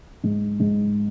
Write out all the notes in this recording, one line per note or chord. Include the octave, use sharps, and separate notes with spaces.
G#2
G#2